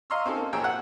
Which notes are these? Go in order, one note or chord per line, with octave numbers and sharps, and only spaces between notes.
D#5 F5 A#5 C6 C#6 E6
C4 C#4 D#4 A4
A#3
A#1 G#4 C#5 G5 A#5 E6
F#5